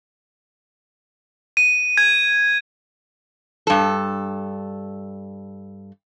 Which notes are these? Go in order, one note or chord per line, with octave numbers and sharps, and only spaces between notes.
D#7
G#6
G2 A4